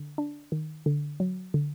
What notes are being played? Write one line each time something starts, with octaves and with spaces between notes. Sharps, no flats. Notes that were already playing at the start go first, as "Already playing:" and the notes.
Already playing: D3
D4
D#3
D3
F#3
D3